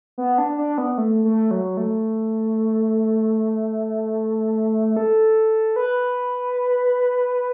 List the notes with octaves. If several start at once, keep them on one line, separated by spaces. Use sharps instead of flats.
B3
D4
D4
B3
A3
A3
F#3
A3
A4
B4